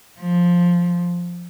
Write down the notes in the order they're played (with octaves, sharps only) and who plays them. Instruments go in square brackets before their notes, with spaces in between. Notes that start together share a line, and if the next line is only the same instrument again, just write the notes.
[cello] F3